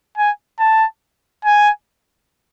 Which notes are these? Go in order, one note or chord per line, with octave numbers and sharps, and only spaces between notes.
G#5
A5
G#5